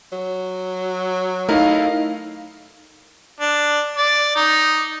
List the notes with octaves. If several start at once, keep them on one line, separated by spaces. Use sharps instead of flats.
F#3
A3 D#4 E4 A#4 D#5 F5
D4
D5
D#4